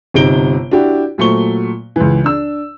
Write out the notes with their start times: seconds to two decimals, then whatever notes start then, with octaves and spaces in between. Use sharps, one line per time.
0.14 G1 C3 D#4 D7 G7
0.71 D4 E4 F#4 G4
1.18 A#2 F#3 A3 C5 C#6 G7
1.96 C#2 E3
2.24 D4 E6